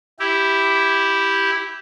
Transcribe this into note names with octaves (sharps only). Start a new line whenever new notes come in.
E4 G4